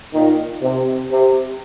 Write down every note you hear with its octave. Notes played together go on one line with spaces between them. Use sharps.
A#2 D#3
C3
C3